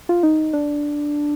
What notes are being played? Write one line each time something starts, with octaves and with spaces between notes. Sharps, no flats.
F4
D#4
D4